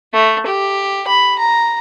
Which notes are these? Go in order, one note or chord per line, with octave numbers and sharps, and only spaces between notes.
A3
G4
B5
A#5